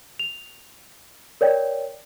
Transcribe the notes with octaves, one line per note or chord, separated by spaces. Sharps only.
F7
A#4 C#5 D5 G5